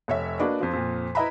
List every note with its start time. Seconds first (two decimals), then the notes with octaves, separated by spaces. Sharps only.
0.08 F1 C#5 E5
0.39 A#3 D4 F#4 B4 D5 D#5
0.60 F2 F3
0.73 F2 A#2
1.15 E4 B4 D#5 E5 A#5 B5